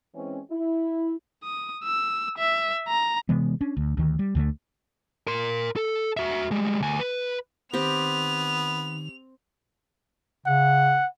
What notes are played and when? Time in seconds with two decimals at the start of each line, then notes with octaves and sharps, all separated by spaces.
0.15 E3 G#3 C4 C#4
0.51 E4
1.43 D#6
1.84 E6
2.37 E5
2.88 A#5
3.29 C3 E3 G#3 B3
3.61 C#4 D4
3.77 D2
3.97 D2 D#3
4.19 G3
4.35 D2 D3 F3 A3
5.27 A#4 C6
5.76 A4
6.17 F#4 E5
6.51 G3 G#3
6.81 D2 G#5
7.00 B4
7.73 D#3 B3 C4 G4 F7
10.46 C#3 F#5